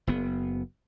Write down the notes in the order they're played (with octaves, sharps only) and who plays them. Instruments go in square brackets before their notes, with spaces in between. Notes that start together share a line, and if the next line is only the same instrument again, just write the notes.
[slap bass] F#1 B3